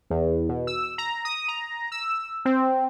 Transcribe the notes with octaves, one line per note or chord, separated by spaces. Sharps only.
E2
B2
E6
A#5
D#6
A#5
E6
C4